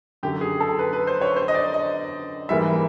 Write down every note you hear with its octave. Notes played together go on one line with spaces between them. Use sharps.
F#2 D3 F#3 G4
G#4
A4
B4
B4
C5
C#5
C5
D#5
D5
D#5
G#2 E3 G3 A#3 E5